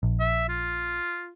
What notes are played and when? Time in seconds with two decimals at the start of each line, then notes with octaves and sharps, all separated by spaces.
0.03 A#1
0.20 E5
0.48 F4